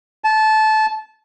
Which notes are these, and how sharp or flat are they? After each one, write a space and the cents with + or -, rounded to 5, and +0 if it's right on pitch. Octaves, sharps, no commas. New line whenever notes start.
A5 -20